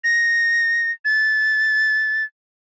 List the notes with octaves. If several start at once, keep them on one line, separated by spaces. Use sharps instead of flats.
A#6
A6